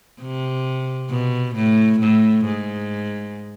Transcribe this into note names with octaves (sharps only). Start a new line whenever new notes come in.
C3
B2
A2
A2
G#2